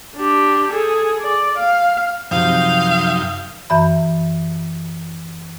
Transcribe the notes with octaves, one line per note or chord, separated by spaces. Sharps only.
D4 G4
G#4 A4
D5
F5
F#2 C3 F3 D#4 F5 G5
F#2 E3 E5 B5